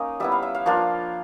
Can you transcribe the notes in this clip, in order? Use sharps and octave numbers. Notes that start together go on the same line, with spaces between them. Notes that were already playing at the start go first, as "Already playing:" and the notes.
Already playing: A#3 C#4 D#4 D#5
G3 B3 E4 E5
F5
E5
F5
F3 A#3 D4 F4